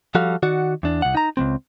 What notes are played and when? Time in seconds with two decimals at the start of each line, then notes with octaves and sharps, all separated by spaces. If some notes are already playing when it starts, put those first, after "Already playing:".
0.15 F3 G3 F#4 A4 F5
0.43 D#3 F#4 D5 F#5
0.83 E2 D4
1.02 C2 F#5
1.15 D#4 A#5
1.37 C#2 F#3 C4